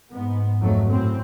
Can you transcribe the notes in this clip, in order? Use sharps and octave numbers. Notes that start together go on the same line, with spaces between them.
G#2 B3
G#1 F2 G#2 F#3 A3
F#2 A2 C4